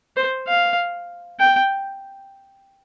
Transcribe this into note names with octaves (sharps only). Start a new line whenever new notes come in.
C5
F5
G5